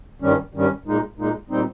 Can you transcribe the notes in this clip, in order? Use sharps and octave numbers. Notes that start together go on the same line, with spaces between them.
G2 D#3 G3 C#4
G2 D#3 G3 C#4
A#2 G#3 D#4
A#2 G#3 D#4
A#2 G3 C4 D#4